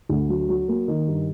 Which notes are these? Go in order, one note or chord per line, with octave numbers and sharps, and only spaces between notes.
D2
F#3
F#3
A#3
D#3
G2